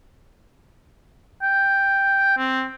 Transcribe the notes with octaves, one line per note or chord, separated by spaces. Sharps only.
G5
C4